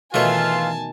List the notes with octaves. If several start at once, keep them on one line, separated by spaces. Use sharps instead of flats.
B2 D#3 E3 A3 F4 C#5 G#5 A5